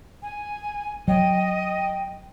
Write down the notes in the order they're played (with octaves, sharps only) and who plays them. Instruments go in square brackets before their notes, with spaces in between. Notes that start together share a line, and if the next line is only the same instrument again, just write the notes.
[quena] G#5
[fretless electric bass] F#3 [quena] D#5 [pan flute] G5
[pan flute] G5